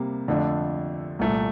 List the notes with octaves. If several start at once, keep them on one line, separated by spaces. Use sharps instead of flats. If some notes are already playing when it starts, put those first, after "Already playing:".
Already playing: C3 G3 A#3
F2 D3 A3 D4 F4
C2 A#2 A3